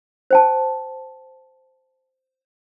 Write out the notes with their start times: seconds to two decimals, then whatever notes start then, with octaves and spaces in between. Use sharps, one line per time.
0.31 C5 G5 A5